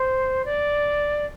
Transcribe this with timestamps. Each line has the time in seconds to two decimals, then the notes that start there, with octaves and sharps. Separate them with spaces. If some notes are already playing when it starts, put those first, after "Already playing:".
Already playing: C5
0.45 D5